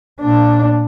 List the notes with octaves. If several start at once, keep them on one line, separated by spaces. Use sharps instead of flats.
A#2 D4